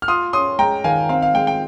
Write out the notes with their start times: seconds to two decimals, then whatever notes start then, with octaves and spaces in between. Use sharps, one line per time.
0.02 F6
0.08 F4 C6 D#6
0.33 C#4 C6 D#6
0.59 G#3 G5 A#5
0.84 D#3 F5 G#5
1.09 C4 F5
1.22 F5
1.34 G#3 G5
1.47 G5